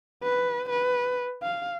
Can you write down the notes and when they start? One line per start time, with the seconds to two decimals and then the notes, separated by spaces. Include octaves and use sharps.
0.23 B4
0.70 B4
1.43 F5